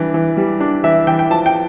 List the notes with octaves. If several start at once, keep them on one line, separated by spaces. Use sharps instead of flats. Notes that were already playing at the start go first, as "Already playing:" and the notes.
Already playing: E3 G3 D4
E3
G3
D4
E3 E5
E3 G5
G5
F3 A5
G5